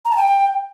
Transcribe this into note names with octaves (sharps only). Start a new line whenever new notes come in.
A#5
A5
G5